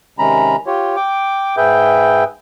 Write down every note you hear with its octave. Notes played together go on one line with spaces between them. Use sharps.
C3 D#3 G#3 C#4 A#5 B5
F4 G4 C#5
G5 D6
G#2 G#4 B4 E5 G5 G6